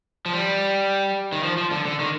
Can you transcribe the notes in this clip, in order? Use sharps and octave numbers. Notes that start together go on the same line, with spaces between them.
F3
G3
D#3
F3
F3
D3
D3
D#3